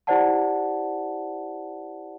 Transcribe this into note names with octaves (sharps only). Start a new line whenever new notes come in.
E4 G4 C5 D5 F#5 A5